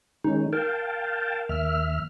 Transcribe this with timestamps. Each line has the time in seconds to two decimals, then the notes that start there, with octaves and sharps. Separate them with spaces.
0.24 D#3 G#3 C#4 D#4
0.53 A#4 F5 G5 A5
1.49 D#2 E5 F6